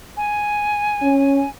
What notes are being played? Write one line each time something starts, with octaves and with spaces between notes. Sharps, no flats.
G#5
C#4